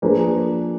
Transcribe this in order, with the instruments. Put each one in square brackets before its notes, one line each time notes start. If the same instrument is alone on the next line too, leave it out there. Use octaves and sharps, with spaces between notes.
[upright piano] F3 A#3 D4 G#4 B4